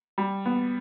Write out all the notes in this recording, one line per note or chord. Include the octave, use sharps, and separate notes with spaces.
G3
B3